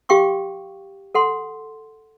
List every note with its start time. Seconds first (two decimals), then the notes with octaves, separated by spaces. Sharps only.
0.09 G4 F5 G5 C#6 D6
1.15 A4 F#5 C6